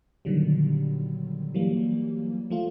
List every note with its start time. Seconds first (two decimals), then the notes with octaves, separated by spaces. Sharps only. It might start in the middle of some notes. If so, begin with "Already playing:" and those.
0.25 A#2 D3 D#3 F#3 G3
1.54 E3 F#3 G3 A#3
2.50 F3 A3 F4